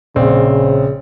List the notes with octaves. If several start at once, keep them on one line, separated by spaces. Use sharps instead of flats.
A#1 C#3 C4